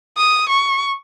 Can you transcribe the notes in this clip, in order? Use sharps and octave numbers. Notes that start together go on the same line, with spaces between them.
D#6
C#6